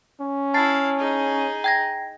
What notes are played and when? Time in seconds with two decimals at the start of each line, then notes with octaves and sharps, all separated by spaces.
0.21 C#4
0.54 E4 F5 A5 A6 C7
0.98 D#4 G#4
1.64 G5 G#6 A#6